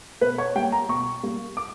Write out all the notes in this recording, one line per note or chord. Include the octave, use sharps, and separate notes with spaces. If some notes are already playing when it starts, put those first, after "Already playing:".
B2 B4
C#5
G3 A#3 G5
A#5
B2 C#6
G3 A#3
D6